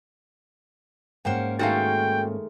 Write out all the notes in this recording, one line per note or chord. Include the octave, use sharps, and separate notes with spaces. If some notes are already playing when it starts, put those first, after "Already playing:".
G#2 A#3 C#4 C5 F#5 G5
D#3 G#3 A3 F#4 A4 F5 G5